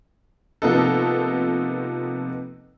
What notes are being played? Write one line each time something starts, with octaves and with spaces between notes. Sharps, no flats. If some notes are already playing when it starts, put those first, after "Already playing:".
C3 F3 A#3 B3 D#4 A4